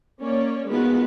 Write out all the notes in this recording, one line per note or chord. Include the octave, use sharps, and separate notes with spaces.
A#3 C#4 C#5 D5
D#3 G#3 B3 F4 F#4 B4